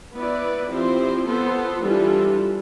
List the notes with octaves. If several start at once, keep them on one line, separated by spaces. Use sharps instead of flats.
B3 E4 B4 D5
F3 C4 E4 G4 C5
B3 F4 A4 C5
E3 G3 D4 F4 A4